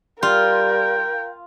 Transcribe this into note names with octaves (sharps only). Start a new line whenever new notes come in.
G3 F4 A#4 G5